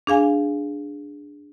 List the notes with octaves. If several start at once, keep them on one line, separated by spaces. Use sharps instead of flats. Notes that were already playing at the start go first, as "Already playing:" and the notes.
D4 G#4 F5 G#5